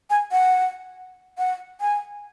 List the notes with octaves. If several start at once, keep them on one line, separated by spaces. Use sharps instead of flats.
G#5
F#5
F#5
G#5